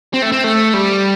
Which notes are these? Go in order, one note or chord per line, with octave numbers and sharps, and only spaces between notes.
C4
A3
C4
A3
G3